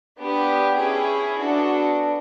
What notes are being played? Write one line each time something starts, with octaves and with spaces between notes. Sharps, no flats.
B3 D4 G4
C#4 E4 G#4
B3 D4 F#4 A4